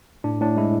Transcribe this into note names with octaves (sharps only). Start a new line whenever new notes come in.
A2 D4
A2 D4
G#3 E4